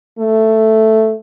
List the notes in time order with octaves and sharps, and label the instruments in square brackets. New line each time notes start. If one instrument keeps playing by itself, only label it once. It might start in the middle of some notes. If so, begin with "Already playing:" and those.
[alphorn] A3